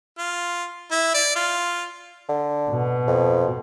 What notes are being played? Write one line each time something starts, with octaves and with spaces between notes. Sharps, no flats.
F4
E4
D5
F4
D3
B2
F2